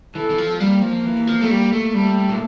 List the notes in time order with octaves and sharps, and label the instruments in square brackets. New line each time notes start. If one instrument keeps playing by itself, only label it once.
[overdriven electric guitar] E3 [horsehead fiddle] A4
[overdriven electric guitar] E3
F3
[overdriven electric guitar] G3 [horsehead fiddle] A#3
[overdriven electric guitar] F3
E3
F3
A3
G3
A3
[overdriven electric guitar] G3 [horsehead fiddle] A3
[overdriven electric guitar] A#2